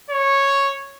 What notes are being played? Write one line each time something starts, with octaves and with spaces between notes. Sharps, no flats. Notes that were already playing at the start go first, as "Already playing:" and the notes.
C#5